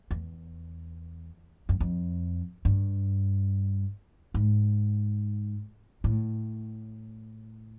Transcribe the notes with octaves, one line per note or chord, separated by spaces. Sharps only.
E2
F#2
F2
G2
G#2
A2